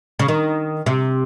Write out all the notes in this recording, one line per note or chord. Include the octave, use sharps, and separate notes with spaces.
C#3
D#3
C3